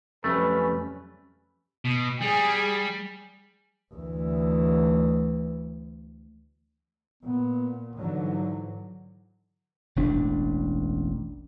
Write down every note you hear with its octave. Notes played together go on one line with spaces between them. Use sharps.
F2 F#3 G3 A3 C#4 B4
B2
G3 G#4
D2 E3
A#2 B3
G#2 D3 E3 F#3
E1 A1 D4